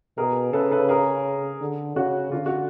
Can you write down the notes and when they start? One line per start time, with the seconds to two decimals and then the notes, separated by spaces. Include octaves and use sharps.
0.18 B2 G#4 A#4
0.53 C#3 A4 B4
0.71 A4 B4
0.89 G#4 A#4
1.61 D3
1.96 C#3 F#4
2.32 D3 F4
2.46 F#4